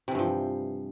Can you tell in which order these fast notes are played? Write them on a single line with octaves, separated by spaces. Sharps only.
C3 E3 G2 F3